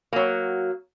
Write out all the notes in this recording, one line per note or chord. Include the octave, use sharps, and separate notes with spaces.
F#3 A#3